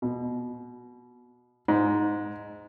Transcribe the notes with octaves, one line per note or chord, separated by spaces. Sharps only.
B2
G#2